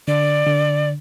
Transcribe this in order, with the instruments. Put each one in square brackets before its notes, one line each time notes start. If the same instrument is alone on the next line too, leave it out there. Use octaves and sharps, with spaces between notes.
[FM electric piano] D3 [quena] D5
[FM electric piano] D3